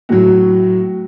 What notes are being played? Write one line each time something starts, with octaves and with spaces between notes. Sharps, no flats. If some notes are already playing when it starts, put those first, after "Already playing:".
A2 F#3 F#4